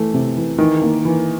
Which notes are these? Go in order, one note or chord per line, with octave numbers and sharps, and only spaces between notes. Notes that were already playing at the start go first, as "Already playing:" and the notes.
Already playing: E3 A3
C3
E3
D#3 E3
A#3
E3